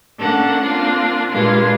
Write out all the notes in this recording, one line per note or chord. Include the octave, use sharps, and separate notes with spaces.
A3 A#3 C#4 D4 A4 F#5
A#3 C4 D4 F4
G2 A#2 G#3 A#3 F4